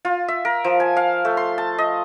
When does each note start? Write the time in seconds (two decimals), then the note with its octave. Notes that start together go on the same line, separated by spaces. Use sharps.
0.05 F4
0.28 E5
0.45 A#4
0.64 F3
0.80 G#5
0.97 F5
1.25 A3
1.37 C6
1.58 A5
1.78 D#5